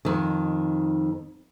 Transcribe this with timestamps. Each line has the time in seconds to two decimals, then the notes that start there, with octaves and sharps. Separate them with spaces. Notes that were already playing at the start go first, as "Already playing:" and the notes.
0.05 F2 D#3